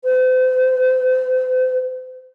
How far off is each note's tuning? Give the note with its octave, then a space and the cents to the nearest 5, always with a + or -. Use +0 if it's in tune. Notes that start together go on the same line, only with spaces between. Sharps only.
C5 -40